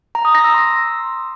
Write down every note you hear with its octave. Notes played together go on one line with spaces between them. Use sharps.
A#5
D#6
A#6
E6
C6